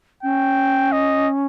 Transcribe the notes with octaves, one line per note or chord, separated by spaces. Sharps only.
C#4 G5
D#5